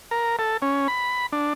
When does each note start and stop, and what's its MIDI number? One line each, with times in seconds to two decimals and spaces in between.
0.11 0.36 70
0.39 0.57 69
0.62 0.88 61
0.88 1.26 83
1.32 1.53 62